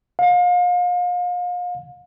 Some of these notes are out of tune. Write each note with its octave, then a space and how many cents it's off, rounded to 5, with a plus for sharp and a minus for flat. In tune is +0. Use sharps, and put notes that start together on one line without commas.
F5 +35